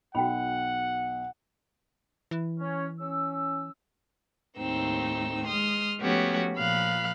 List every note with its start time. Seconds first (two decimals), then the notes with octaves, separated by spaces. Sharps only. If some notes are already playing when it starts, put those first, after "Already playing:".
0.15 B1 F#4 F#5 G5 B5
2.31 E3
2.59 C#4
3.00 C#4 E6
4.58 D#2 A2 C4 D#4 E6
5.46 G#3 C6 D#6 F6
6.00 F3 A3 B3 C#4 F#4 G4
6.56 A#2 F3 F5 B5 F#6